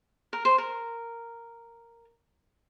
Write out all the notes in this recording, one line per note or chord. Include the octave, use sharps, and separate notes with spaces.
A#4
C5
A#4